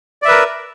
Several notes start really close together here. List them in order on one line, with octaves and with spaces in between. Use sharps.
D5 E5 B4 A#4